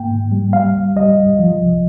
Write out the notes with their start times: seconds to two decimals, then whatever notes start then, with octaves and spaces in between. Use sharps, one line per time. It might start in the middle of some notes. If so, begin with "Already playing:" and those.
Already playing: G#2 A#3 G5
0.11 G#2
0.32 G3
0.53 G3 F5
0.75 C#2
0.96 G3 D#5
1.18 C#2
1.39 F3
1.61 C2